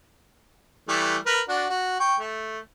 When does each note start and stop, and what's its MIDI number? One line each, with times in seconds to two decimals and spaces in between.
0.88 1.17 52
0.88 1.17 55
0.88 1.17 57
1.26 1.41 70
1.26 1.41 71
1.48 1.65 62
1.48 1.65 66
1.69 1.99 66
2.00 2.16 79
2.00 2.16 85
2.19 2.59 57